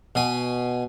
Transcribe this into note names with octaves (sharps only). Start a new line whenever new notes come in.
B2 G#5